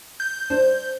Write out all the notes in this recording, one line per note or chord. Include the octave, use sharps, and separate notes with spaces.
G6
D4 C5